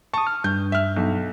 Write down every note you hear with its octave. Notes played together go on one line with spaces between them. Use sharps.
A5 C#6 D#6
F6
G2 G6
E5 F6
B1